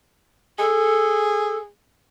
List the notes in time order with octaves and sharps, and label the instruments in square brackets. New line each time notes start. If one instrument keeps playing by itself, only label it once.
[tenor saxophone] G#4 [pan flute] A4